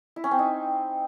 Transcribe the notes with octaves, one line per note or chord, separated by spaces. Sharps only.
E4
C#4
C4
D#4